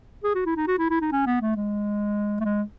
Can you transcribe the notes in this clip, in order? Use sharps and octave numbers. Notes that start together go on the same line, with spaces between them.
G#4
F#4
E4
D#4
F#4
E4
E4
D#4
C#4
B3
A3
G#3
A3
G#3